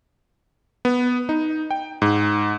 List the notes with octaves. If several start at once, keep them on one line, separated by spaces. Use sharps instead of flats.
B3
D#4
G5
G#2